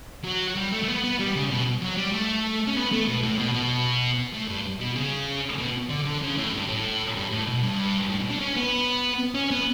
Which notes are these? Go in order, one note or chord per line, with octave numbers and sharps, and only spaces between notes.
F#3
G3
A3
A3
B3
B3
G3
C#3
B2
F#3
G3
A3
C#4
B3
A3
B2
A2
B2
B2
A2
G2
B2
C#3
B2
D3
D3
C#3
A2
G2
A2
G2
A2
B2
G2
A2
B2
D3
C#4
B3
C#4
B3